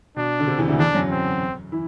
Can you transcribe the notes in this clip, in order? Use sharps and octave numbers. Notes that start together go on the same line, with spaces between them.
B2 D4
D3
C3
E2 E3
D2 D3
E2 E3 D4
F#2 F#3
C4
E3 E4